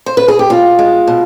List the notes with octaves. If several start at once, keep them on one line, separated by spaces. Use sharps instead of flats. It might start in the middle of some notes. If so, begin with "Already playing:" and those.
C5
B4
G#4
G4
B2 F4
G#3
B2